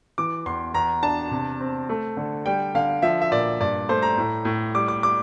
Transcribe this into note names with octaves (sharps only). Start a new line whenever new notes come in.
E3 D6
E2 C6
E2 A#5
D4 A5
C3
C4
A3
D3
G3 G5
D3 F5
F3 E5
E5
A#2 D5
G2 D5
A3 C5
A#5
A2
A2
G3 D6
D6
G3 D6